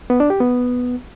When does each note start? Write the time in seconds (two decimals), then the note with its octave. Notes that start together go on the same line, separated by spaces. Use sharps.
0.10 B3
0.20 D4
0.30 G4
0.40 B3